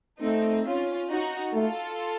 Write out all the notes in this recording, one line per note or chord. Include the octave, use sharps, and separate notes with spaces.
A3 C4 D#4
C#4 F4
D#4 F#4
A3 F4 A4